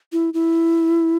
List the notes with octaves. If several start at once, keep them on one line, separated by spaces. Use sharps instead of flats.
E4
E4